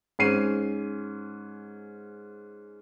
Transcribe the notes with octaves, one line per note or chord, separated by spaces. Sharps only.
G#2 C#4 C7 D#7